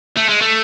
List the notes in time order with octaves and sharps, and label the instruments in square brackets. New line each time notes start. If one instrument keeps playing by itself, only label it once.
[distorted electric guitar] A3
G#3
A3